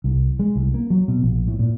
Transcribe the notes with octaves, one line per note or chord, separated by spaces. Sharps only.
C2
G#3
C2
A#3
F#3
B2
A#1
A2
A#2